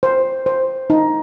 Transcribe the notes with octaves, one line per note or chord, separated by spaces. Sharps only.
C5
C5
D#4